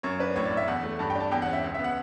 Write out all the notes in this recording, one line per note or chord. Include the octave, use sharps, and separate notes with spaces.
F#2 C#5
D4 B4
A2 C#5
D5
A2
E5
E2 F#5
A3
G2 A5
G5
D4
A5
E2 G5
F#5
C#4
E5
C#2
E5
B3
F#5